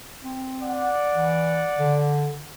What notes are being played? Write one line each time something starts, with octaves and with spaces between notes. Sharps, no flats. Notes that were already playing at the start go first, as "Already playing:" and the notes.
C4
D5 F#5
E3
D3